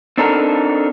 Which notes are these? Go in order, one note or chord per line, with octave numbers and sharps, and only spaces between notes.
C4 D4 D#4 A4 A#4